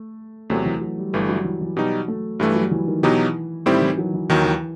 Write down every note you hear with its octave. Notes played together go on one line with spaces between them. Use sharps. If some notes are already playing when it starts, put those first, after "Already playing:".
Already playing: A3
E2 C3 F#3 A3
E3
F#3
G3
G1 G2 E3 G3 A3
F#3
E3
E3
B2 F#3 G3 D#4 G4
A3
G2 E3 G3 A3
F#3
E3
D#3
B2 E3 F#3 B3 D#4 G4
A2 D#3 G3 C4 E4 G4
E3
F#3
E3
D#2 D#3 E3 F#3
E3